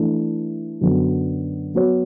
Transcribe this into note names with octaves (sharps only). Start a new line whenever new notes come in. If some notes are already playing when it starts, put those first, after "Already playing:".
Already playing: E3 A3 D4
F#2 D3 F#3 B3
F#3 B3 F#4 C#5